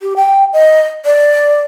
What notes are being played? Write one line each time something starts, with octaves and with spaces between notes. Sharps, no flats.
G4
G5
D#5
D5